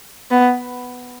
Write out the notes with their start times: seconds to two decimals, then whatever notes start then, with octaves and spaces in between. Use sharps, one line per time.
0.31 B3